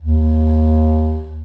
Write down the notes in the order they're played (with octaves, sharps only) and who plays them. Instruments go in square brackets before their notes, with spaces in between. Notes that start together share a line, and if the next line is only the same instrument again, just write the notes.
[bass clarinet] D#2